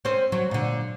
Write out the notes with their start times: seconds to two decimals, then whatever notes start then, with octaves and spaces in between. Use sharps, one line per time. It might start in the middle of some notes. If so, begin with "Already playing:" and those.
0.05 C4 C#4 C5
0.32 F#3
0.51 A#2 D3